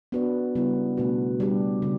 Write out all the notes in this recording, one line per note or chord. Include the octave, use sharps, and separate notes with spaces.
B3 D4 F#4 B4 D5
C#3 G3 B3 E4
B2 A3 D4 F#4 B4
G3 D4 G4
C#3